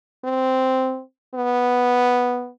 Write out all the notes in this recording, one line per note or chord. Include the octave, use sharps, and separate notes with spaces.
C4
B3